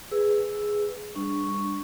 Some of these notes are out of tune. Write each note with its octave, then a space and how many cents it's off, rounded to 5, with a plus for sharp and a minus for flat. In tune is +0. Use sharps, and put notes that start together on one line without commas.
G#4 +0 B4 +0 E6 +0
G3 +30 D4 +0 C#6 +0